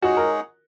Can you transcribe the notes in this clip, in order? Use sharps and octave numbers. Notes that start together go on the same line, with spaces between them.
G#3 D#4 F#4 G#4 C#5 F#5
A#4